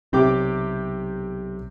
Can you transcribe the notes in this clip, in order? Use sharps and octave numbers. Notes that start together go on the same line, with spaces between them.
B1 C3 G4 D6